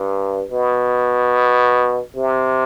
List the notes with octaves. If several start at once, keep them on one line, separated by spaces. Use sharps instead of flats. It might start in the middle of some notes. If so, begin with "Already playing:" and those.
Already playing: G2
B2
C3